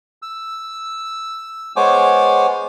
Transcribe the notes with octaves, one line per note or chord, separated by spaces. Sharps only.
E6
G#3 B3 C5 C#5 G#5 D6